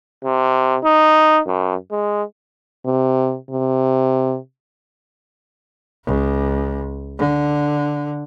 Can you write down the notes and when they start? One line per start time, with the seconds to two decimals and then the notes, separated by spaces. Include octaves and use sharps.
0.24 C3
0.84 D#4
1.47 F#2
1.91 G#3
2.86 C3
3.51 C3
6.05 C#2
7.19 D3